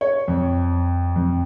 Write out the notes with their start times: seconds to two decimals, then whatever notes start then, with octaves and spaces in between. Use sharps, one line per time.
0.01 C#5
0.28 F2
1.16 F2